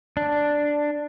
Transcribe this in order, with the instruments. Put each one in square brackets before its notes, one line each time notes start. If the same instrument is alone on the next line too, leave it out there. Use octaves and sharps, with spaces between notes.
[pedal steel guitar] D4